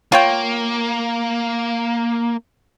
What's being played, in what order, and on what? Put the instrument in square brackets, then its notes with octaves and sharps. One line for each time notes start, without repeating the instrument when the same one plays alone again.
[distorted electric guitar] A#3 [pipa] F4 C#5 G5